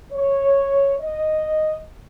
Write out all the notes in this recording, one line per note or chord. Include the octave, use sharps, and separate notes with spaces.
C#5
D#5